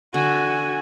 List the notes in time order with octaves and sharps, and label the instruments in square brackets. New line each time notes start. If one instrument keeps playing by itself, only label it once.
[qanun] D3 [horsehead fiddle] F#4 G#5